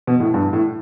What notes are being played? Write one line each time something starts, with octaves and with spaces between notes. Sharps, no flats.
B2
A2
G2
A2